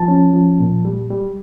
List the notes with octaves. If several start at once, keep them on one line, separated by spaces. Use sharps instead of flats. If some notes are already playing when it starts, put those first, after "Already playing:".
Already playing: F3 A5
C#4
F3
A#2
G3
G3